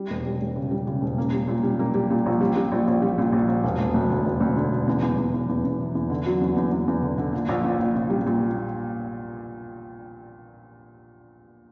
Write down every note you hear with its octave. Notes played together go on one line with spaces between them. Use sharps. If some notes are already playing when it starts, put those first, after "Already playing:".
Already playing: G3
E1
G3
E1
C#3
G3
C#3
E1
A#3
G3
A#2
G3
A#3
G3
A#2
A#1
G3
G3
A#1
A#1
G3
A#2
A#1
A#1
E1
E1
D2
D3
E1
D2
D3
E1
E2
E2
E2
E2
E2
E2
E3
E2
D3
F#3
E2
E2
E2
E2
D3
D3
A#2
A#1
A#2
A#1
A#2
G3
A#2